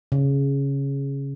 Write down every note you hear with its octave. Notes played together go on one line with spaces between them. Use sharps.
C#3